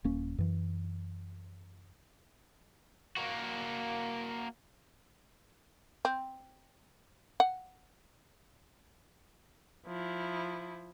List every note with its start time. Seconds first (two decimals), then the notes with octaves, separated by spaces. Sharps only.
0.04 D#1 A#3 C#4
0.38 F#2 E3
3.17 A#3 F#4
6.05 C4
7.40 F#5
9.86 F3 E4